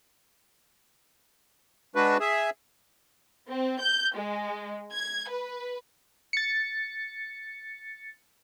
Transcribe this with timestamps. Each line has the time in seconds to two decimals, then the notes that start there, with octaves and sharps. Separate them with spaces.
1.96 G#3 D4 F#4 B4
2.20 G#4 E5
3.48 C4
3.80 G6
4.15 G#3
4.93 G#6
5.29 B4
6.33 A6 C#7